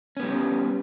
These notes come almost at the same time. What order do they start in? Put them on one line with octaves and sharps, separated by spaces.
C#4 B3 G3